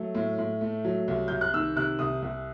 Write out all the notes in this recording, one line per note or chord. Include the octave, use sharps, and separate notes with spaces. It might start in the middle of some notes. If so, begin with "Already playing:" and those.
Already playing: F#3 A3
A2
A2
A3
F#3
C2
C2 G6
F#6
D#3 E6
C3 F#6
C2 D#6
C2